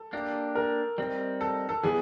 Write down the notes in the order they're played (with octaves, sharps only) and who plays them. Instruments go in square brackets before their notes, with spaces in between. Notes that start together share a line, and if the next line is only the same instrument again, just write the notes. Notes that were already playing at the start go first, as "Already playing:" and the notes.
Already playing: [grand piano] A4
[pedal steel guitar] A#3 D4 G4
[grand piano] A#4
[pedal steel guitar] G3 C4 D#4
[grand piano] A4
A4
[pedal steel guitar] E3 G3 B3 E4 [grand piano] G#4